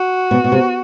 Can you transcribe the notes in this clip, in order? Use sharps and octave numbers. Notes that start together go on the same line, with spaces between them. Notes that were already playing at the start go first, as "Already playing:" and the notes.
Already playing: F#4
B2
B2
C3